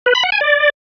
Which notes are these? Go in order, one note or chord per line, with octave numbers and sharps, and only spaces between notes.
B4
B5
F#5
G#5
D5